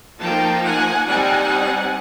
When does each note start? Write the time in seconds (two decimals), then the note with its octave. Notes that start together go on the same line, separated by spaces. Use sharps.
0.21 F3 A#3 D#4 G5 A5
0.64 F#5 G#5
1.07 G3 C4 D#4 F#5 G#5